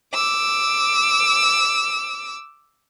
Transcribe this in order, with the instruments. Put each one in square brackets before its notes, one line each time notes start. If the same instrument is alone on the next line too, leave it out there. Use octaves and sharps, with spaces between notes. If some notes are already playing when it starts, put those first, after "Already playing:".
[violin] D6 E6